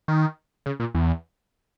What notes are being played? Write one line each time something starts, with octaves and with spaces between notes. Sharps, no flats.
D#3
C#3
A#2
E2